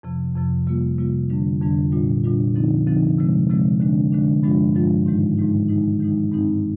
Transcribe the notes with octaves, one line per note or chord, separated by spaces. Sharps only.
F2 C3 F3
F2 C3 F3
C3 G3 A#3 F4
C3 G3 A#3 F4
F2 D3 G3 D4
F2 D3 G3 D4
A#2 G3 D4 F4
A#2 G3 D4 F4
D3 F3 C4 D#4
D3 F3 C4 D#4
C3 F3 G#3 C4
C3 F3 G#3 C4
D3 G#3 D4
D3 G#3 D4
G2 F3 G#3 D4 F4
G2 F3 G#3 D4 F4
G#2 D#3 G#3 D#4
G#2 D#3 G#3 D#4
D#3 G#3 D#4
D#3 G#3 D#4
G2 D#3 G#3 C4 D#4